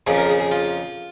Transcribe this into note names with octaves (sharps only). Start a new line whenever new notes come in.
F2 C#3 F3 A#3 G#4
A#4
G#4
G#4
F4